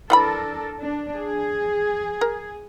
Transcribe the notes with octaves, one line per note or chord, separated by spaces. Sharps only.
E3 D4 A4 A#4 F#5 B5
D4
G#4
A#4